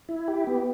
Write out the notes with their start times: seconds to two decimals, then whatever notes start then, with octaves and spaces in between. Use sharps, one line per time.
0.09 E4
0.28 G4
0.47 B3